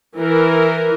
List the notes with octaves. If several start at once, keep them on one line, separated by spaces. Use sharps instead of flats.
E3 A#4